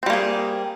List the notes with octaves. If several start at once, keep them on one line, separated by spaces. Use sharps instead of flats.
G3 A#3 C4 G#4